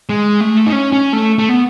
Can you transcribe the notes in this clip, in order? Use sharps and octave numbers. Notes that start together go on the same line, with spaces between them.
G#3
A3
D#4
C#4
C#4
A3
A3
B3